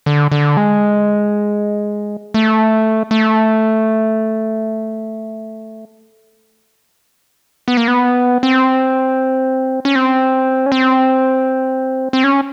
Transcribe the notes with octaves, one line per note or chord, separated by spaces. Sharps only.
D3
D3
G#3
A3
A3
B3
A#3
B3
C4
C#4
C4
C#4
C4
C4
C#4